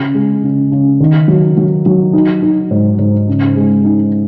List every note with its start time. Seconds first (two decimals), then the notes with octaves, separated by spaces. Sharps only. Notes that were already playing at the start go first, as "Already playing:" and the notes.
Already playing: C#3
0.14 G#3
0.43 C#3
0.72 C#3
1.00 D#3
1.28 F#3
1.57 F#3
1.86 F#3
2.13 D#4
2.42 D#4
2.71 G#2
2.99 G#2
3.28 C#3
3.56 G#3
3.84 D#4